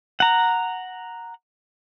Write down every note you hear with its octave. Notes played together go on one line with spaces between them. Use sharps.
F#5 A#5